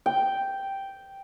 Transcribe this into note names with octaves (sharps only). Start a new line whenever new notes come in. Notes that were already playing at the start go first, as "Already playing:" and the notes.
G5